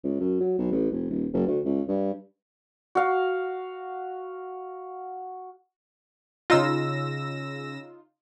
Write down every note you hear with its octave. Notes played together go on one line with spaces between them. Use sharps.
C#2
F#2
F#3
B1
A1
F1
D#1
F#1
D2
C#2
G2
F#4 F5
C#3 D#4 F4 E6 A#6